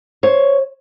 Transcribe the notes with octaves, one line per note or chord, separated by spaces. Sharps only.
C5 C#5